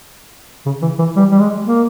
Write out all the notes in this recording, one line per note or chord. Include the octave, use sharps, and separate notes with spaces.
C#3
E3
E3
G3
G3
G#3
A#3